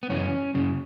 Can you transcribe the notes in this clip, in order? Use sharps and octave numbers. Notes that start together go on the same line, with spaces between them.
B3
F#2 C#3 E3 C#4
F#2 C#3